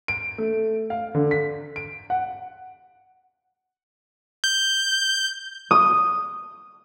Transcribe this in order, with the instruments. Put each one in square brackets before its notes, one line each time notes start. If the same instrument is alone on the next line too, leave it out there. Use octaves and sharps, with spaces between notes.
[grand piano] D7
A3
F5
D3
B6
D7
F#5
[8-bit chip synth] G6
[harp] D#6